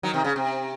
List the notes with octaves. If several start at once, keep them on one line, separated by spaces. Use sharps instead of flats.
D#3 F#3
C3 D#3
C#3
C3